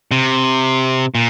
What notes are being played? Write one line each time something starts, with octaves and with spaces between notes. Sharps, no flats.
C3
A#2